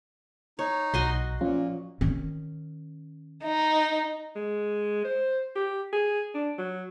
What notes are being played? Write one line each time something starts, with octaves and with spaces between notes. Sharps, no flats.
D#4 C#5
B1 F#4 D#5 C6
A#2 F3 C#4 F4
D#3 C#4
D#4
G#3
C5
G4
G#4
D4
F#3